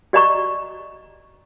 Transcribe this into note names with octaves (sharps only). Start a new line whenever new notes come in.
F#4 D5 D#5 A#5 C#6